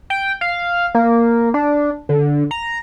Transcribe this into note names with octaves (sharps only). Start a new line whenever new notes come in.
G5
F5
A#3
D4
D3
A#5